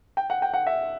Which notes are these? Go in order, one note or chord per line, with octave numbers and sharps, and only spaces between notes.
G5
F#5
G5
F#5
E5